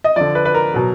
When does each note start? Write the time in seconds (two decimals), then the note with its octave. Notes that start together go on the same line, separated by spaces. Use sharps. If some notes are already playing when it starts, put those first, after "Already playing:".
0.04 D#5
0.16 D3 F3 D5
0.35 B4
0.45 B4
0.54 A#4
0.74 B2 F#3